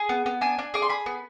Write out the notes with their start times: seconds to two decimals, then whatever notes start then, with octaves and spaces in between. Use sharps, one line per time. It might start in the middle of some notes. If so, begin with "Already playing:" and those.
Already playing: G#4
0.09 B3
0.26 B3
0.41 D4 G#5
0.59 D4
0.74 G#4 D6
0.82 C6
0.89 G#4 B5
1.06 B3